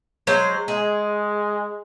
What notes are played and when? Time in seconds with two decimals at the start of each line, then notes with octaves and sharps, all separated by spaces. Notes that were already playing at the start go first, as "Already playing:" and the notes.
0.27 F#3 G#3 C5
0.68 G#3 G#4